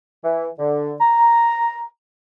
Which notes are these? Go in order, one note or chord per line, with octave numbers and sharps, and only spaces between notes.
E3
D3
A#5